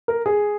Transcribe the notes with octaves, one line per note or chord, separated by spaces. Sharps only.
A#4
G#4